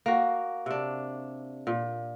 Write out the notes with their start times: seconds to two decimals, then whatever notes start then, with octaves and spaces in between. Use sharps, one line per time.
0.06 A#3 F#4
0.66 C3 D4
1.67 A#2